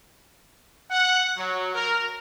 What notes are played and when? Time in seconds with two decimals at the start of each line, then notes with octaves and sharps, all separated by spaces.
0.90 F#5
1.37 F#3
1.74 A#4